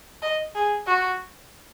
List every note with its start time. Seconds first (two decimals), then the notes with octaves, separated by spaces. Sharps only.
0.22 D#5
0.55 G#4
0.86 F#4